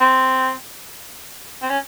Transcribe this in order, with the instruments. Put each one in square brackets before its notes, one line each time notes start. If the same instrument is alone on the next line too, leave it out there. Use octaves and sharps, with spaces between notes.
[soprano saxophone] C4
C4
C#4